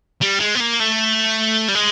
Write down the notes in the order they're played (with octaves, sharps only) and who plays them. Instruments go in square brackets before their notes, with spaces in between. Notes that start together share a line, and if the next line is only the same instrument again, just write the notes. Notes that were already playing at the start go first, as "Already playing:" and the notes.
[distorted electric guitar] G3
G#3
B3
A#3
A3
G3
G#3